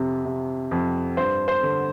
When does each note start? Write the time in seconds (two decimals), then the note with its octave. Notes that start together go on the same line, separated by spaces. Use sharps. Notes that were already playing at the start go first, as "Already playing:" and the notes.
Already playing: F2 C3
0.25 C3
0.71 F2
1.17 G2 C5
1.48 C5
1.63 D3